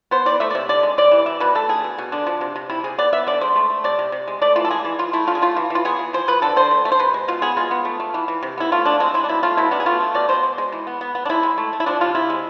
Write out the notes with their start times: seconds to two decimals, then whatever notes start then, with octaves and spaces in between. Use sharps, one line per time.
0.11 B3 C5
0.26 E3 D5
0.40 A3 E5
0.50 D5
0.55 C3 E5
0.69 D3 D5
0.83 G#3
0.98 C3 D5
1.11 E3
1.26 B2 E5
1.40 B2 B4
1.55 A3 A4
1.69 D3 G#4
1.84 B2
1.98 B2
2.12 D3 D4
2.27 F3
2.41 C3
2.56 C3
2.70 C3 E4
2.84 C3 G#4
2.98 B3 D5
3.13 B3 E5
3.27 D3 D5
3.41 G#3 C5
3.56 A3
3.70 A3
3.84 C3 D5
3.99 C3
4.12 C3
4.27 G#3
4.42 A3 D5
4.56 E3 F4
4.65 A4
4.70 G#3 G#4
4.85 E3
4.99 E3 F4
5.13 A3 E4
5.27 D3 F4
5.35 G#4
5.42 A3 F4
5.56 E3
5.70 E3 F4
5.85 B3 G#4
5.99 E3
6.13 F3 C5
6.28 F3 B4
6.42 D3 A4
6.56 D3 C5
6.71 A3
6.85 A3
6.92 C5
6.99 C3 B4
7.14 G#3
7.28 B2 F4
7.42 B3 G#4
7.57 G#3 F4
7.71 B3
7.85 A3
8.00 A3
8.14 E3
8.28 E3
8.43 C3
8.58 B3 E4
8.72 A3 F4
8.85 D3 D4
9.00 G#3 C4
9.14 G#3 E4
9.24 D4
9.29 B2 E4
9.43 A3 F4
9.57 B2 E4
9.71 B3 D4
9.80 G#4
9.86 A3 F4
10.00 A3
10.15 B2 D5
10.29 B2 C5
10.43 G#3
10.58 G#3
10.72 E3
10.87 B3
11.01 B3
11.15 B3
11.25 D4
11.29 G#3 E4
11.43 G#3
11.58 A3
11.73 A3
11.80 E4
11.86 F3 D4
12.01 C3 F4
12.15 C3 E4
12.30 G#3